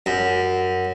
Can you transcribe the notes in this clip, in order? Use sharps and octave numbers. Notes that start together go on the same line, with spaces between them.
F#2